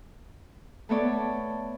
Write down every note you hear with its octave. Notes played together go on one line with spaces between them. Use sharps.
A3 B3 A4 C#5 D5